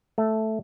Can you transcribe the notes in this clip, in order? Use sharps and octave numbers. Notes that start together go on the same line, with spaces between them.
A3